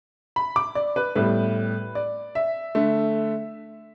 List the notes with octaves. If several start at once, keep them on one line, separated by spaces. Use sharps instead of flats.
B5
D6
D5
B4
A2 G3 B3 B4
D5
E5
D3 A3